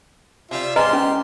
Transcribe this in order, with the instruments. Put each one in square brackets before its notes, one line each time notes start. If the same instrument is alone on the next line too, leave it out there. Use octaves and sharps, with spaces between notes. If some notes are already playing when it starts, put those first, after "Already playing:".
[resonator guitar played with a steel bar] C3 G3 [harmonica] F4 E5
[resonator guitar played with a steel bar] G#3 C4 [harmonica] G4 C6 [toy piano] B4 D#5 A#5
[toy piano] C#4